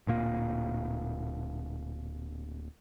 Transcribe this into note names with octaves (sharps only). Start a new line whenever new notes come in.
D1 A#2 A#3